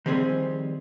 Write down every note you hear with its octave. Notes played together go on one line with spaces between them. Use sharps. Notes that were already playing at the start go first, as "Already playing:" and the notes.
D#3 F3 G3 C4 G#4